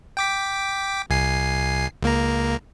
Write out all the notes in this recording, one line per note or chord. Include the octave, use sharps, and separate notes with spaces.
G5 D6 B6
C2 G#5 C7
C#2 A#3 A#5